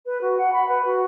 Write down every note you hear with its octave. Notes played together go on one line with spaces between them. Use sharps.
B4
F#4
F#5
B5
B4
F#4